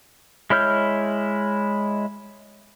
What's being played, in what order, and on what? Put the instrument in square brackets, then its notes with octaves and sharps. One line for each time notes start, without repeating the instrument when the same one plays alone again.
[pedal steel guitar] G#3 E4 C#5 F6 G6